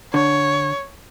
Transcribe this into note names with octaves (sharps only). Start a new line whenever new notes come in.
D3 C#5